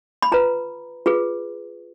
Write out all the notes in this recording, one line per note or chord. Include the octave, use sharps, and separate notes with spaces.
B5
F4 B4 A#5
F4 G#4 B4